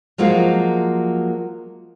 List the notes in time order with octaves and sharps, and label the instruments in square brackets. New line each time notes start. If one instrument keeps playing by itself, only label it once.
[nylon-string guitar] F3 F#3 G#3 A#3 F4